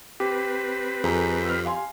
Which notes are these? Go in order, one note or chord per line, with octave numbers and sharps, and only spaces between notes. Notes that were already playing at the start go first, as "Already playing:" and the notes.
C4 G4 B4
F2 G#4 A4 A#5
E6 F6
F5 G#5 C6